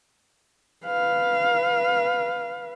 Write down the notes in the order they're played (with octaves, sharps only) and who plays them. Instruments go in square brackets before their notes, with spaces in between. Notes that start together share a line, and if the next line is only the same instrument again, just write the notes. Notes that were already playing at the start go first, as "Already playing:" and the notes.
[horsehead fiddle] B4 F5